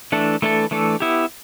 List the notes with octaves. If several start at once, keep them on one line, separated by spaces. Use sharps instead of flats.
E3 A3 D4 A4
E3 A3 D4 A4
E3 A3 D4 A4
B3 E4 G4